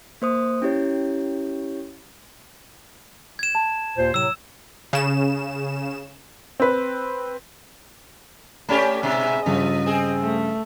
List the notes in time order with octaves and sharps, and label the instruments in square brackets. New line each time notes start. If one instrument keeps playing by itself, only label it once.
[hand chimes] A#3 C5 D#6
C#4 E4 G4 C#5
[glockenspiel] G#6 E7
[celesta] A5
[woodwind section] D#2 A#2 C5
[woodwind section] A2 C3 F#3 [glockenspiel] E6 E7
[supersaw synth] C#3 E7
[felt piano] C4 B4
[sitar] A3 C#4 G4 [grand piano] C#5 D5 B5
[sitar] G#2 B2 [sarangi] E5
[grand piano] G2 C#3 [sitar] F3 [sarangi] D#5
[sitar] C4 G#4
[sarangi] A3